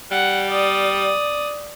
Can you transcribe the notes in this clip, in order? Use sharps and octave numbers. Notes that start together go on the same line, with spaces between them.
G3 F#5
D5 D#6